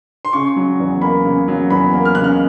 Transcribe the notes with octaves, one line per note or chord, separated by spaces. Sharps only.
C6
C#3 C#6
F#3
E2
A#3 B5
C#3
F#3
E2 B5
A#3
F6
C#3 F#6
F6